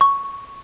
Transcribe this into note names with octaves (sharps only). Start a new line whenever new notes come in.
C#6